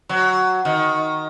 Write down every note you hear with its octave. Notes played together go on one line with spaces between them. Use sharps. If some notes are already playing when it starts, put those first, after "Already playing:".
F#3
D#3